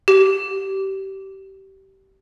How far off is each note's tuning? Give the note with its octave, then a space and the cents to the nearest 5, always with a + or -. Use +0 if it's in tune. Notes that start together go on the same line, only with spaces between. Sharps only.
G4 -25